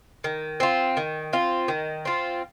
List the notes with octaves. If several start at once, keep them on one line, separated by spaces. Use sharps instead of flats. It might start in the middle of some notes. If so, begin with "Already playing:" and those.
D#3
C4 F4
D#3
C4 F4
D#3
C4 F4